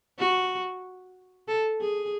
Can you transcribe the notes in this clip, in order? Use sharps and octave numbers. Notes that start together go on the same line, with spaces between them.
F#4
A4
G#4